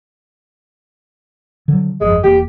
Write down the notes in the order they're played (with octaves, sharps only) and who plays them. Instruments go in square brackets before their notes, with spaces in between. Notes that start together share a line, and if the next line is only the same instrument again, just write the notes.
[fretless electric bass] D3 F#3
[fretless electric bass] G1 F2 [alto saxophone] G#3
[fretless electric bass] E1 A#3 [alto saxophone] G4